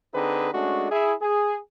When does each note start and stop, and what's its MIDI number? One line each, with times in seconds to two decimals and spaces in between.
0.14 0.49 50
0.14 0.49 60
0.14 0.49 63
0.14 0.49 68
0.14 0.49 71
0.54 0.87 56
0.54 0.87 57
0.54 0.87 61
0.54 0.87 62
0.54 0.87 66
0.92 1.14 64
0.92 1.14 68
1.21 1.57 68